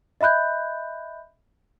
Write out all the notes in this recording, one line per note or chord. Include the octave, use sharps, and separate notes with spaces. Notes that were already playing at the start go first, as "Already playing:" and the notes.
D#5 E5 B5 F#6 G6